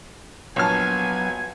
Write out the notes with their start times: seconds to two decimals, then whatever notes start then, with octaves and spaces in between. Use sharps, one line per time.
0.56 A#1 F#3 B3 C#5 G#5 A5 F6